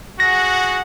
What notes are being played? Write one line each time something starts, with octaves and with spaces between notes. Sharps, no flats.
F#4 G#4 F#5 A#6